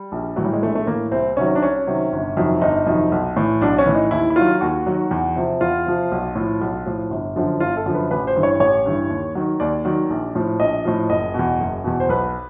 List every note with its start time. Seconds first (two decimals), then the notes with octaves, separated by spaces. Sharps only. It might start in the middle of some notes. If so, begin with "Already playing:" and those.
Already playing: G3
0.12 A#1
0.36 A2 E3 F#3
0.45 G3
0.53 G#3
0.62 A#1 A3
0.75 A3
0.87 A2 E3 A#3
1.12 C2 C4
1.37 C3 D#3 F#3 C#4
1.55 D4
1.63 C2 C#4
1.87 C3 D#3 F#3
2.13 G1
2.37 F2 C3 D#3 F#3
2.61 G1 D#4
2.87 F2 C3 D#3 F#3
3.12 B1
3.37 A2 E3
3.61 B1 D4
3.79 C#4
3.86 A2 E3
3.95 D#4
4.11 D#2 E4
4.30 E4
4.36 D#3 F#3 F4
4.61 D#2 F#4
4.87 D#3 F#3
5.11 E2
5.36 C3 F3
5.61 E2 F4
5.86 C3 F3
6.12 B1
6.35 A2 F3
6.61 B1
6.86 A2 F3
7.10 G1
7.36 F#2 D3 F3
7.60 G1 F4
7.77 A4
7.86 F#2 D3 F3
7.94 B4
8.11 A1 B4
8.27 C5
8.36 G2 E3
8.43 C#5
8.60 A1 C#5
8.86 G2 E3
9.10 D#2
9.35 D#3 F#3
9.60 D#2 D5
9.85 D#3 F#3
10.10 A#1
10.35 A2 F3
10.60 A#1 D#5
10.85 A2 F3
11.10 F#1 D#5
11.34 E2 B2
11.60 F#1
11.84 E2 B2
12.00 C5
12.09 B1 B4